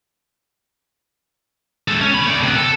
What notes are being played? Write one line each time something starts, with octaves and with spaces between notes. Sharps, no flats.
G#3 A4
C#4
C#4 B5
A3 D5
C3 B3
A4